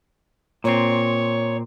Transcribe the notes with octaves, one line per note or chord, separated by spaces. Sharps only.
A#2 C4 C#5